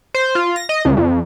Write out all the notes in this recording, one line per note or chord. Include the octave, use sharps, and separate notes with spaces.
C5
F4
A#6
D#5
C#2
F2